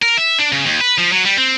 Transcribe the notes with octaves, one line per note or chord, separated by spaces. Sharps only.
A#4
E5
D4
C#3
D#2
B4
F3
F#3
G3
C4